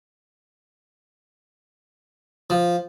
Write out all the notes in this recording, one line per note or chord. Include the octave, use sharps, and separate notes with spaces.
F3